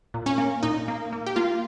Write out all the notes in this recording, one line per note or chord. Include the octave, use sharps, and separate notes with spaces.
A#2
C#4
A#3
A#2 D#4
A#3
A#3
G4
A#3 F4